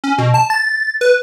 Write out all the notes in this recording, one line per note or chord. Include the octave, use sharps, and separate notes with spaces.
C#4
B2
A5
A6
B4